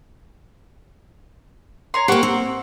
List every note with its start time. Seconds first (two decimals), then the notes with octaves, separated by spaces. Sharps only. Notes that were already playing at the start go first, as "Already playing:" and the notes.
1.94 C#5 A#5 C6
2.08 A#3 G4 C5 F#5 C#6
2.23 C4